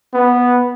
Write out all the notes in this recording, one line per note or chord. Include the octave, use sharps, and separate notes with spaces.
B3